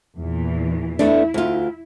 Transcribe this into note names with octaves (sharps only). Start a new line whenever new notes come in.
E2 A#2 E3
A3 B3 D4 E4
D2 F4